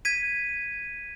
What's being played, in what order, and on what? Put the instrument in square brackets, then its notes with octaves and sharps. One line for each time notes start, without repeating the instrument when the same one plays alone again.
[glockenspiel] G#6 B6 D#7